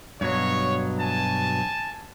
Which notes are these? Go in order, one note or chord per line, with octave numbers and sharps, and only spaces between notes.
G2 B2 F#3 C#5
G#5 A5